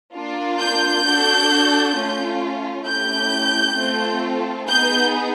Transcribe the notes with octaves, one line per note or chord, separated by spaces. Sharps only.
A#3 D4 F4
G6
D4 F#4 A4
A3 C#4 F4
A3 C#4 E4 G4 G6
A3 C4 F4 A4
B3 D#4 G#4 G6